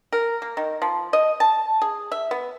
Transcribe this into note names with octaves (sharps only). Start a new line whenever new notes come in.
A#4
A#3
D#3
F3
D#5
A5
G#4
E5
B3